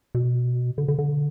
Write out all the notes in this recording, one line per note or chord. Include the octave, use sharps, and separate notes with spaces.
B2
D3
D3
D3